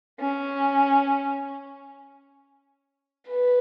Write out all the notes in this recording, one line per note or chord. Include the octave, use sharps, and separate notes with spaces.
C#4
B4